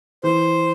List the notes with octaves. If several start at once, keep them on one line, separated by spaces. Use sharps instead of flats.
E3 C5